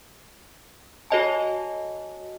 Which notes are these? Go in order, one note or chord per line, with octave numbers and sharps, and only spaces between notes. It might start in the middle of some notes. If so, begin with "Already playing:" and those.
F#4 A4 C#5 D#5 G#5 A5